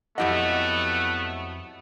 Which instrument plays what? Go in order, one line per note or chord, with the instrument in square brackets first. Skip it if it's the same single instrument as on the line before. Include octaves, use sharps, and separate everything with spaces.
[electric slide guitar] F2 E4 D#5 [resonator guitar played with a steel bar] F#3 G4 F#5 [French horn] A3 [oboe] B3